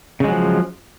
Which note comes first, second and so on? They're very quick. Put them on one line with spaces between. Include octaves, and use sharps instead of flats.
C#3 G#3 F#3 F3